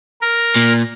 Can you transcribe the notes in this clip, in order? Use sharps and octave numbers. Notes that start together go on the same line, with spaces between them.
A#4
A#2